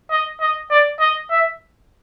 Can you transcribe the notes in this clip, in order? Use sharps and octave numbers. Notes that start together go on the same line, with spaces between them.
D#5
D#5
D5
D#5
E5